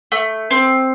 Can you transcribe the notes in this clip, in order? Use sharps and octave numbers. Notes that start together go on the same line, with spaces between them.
A3
C4